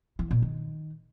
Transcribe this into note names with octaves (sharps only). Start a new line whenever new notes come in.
E3
A#2
D#3